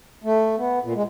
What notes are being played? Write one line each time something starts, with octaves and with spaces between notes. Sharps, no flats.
A3
B3
A#2
G#3